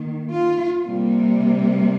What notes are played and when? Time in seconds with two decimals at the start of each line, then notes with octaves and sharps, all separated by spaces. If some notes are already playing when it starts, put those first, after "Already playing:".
Already playing: D#3 A#3
0.31 F4
0.84 C3 G3 A#3